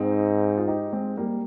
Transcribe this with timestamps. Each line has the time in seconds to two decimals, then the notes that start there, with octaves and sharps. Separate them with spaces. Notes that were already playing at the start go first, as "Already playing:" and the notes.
Already playing: G#2 C4 D#4
0.57 F4
0.68 D#4 G4
0.93 G#3 C4
1.17 G3 A#3